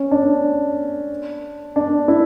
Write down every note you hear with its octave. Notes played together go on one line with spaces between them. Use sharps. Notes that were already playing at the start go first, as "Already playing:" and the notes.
Already playing: C#4
D4
D4
E4